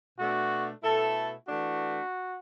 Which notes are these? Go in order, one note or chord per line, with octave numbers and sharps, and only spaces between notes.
B2 A3 D4 F#4
B2 A3 E4 A4
E3 A3 D4 F#4